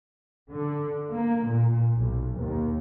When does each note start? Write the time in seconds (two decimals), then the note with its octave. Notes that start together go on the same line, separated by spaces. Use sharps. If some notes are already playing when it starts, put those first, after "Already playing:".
0.51 D3
1.10 A#3
1.47 A#2
1.96 B1
2.41 D#2